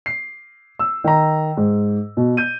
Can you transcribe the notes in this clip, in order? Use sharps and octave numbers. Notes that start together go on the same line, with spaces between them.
C7
E6
D#3 D#4 A#5
G#2
B2
G6 D#7